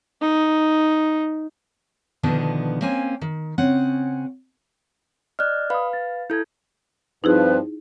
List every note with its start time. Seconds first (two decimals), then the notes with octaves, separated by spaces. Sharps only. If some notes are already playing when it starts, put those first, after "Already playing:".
0.21 D#4
2.23 B2 D3 D#3 F3 B3 D4
2.82 A#3 C4 C#4 G#5
3.21 D#3
3.58 C#3 C4 C#4 F#5
5.39 D5 D#5 F6 F#6
5.70 B4 F5 B5 D#6
5.93 A6
6.30 E4 A4 G6 G#6
7.24 G2 F3 C4 D#4 E4 G#4 B4